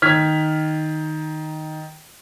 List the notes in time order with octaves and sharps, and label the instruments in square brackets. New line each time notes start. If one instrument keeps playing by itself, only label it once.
[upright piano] D#3 [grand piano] F6 G#6 B6